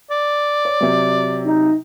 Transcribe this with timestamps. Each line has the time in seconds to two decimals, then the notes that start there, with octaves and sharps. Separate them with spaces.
0.11 D5
0.65 C#5
0.81 C3 F#3
1.45 D#4